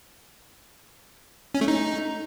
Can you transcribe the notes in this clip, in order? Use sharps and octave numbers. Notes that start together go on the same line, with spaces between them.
C#4
A3
D#4